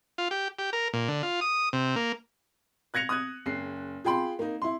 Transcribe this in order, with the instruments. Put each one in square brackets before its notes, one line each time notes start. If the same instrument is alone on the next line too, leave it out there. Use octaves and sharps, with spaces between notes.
[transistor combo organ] F4
G4
G4
A#4
A#2
D3
F4
D#6
C3
A#3
[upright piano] F#6 G#6 A#6 C#7 F7
D#6 F#6 G#6
F#1 C7
F4 G#4 G5 B5 C6
A#3 D#4
E4 C6